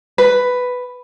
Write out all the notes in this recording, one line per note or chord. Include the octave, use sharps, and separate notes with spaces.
B4